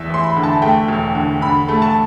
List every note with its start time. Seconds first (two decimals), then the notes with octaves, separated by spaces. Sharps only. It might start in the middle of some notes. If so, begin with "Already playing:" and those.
Already playing: E2 E5
0.10 E2 C6
0.23 B5
0.36 D3
0.43 A5
0.62 A3 G5
0.88 E1
1.15 D3
1.41 D3 B5
1.68 A3
1.82 A5